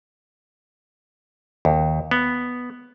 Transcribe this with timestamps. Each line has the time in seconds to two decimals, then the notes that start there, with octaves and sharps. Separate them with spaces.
1.65 D#2
2.11 B3